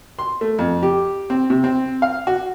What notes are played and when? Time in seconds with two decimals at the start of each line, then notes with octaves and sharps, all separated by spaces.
0.19 C6
0.41 A3
0.59 F2
0.83 G4
1.30 C4
1.50 C3
1.64 C4
2.02 F5
2.27 F#4